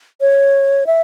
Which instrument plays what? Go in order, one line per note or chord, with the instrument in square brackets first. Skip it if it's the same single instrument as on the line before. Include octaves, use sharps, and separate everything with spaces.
[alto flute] C#5
E5